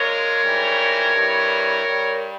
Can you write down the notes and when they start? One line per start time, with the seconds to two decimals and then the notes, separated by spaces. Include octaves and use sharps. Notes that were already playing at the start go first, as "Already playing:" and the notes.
Already playing: A#2 G#3 A#4 C#5
0.43 G#2 E3 G3
1.14 G2 E3 G3
1.86 G2 G3